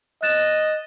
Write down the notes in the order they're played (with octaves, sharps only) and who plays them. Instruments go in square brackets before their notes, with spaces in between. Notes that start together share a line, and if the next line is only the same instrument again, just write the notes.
[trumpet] D#5 [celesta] F#6 A6 E7